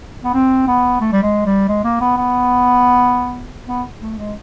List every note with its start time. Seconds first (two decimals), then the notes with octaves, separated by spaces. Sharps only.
0.24 B3
0.34 C4
0.68 B3
1.01 A3
1.13 G3
1.23 G#3
1.46 G3
1.68 G#3
1.84 A#3
2.01 B3
2.18 B3
3.68 B3
4.02 A3
4.18 G#3